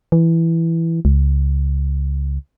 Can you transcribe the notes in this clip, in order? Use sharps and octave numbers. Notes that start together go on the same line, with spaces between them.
E3
C#2